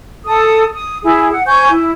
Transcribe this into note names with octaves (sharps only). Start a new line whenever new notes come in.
A4 D#6
D#6
E4 G#4
F#5
C5 G#5 C#6 G6
E4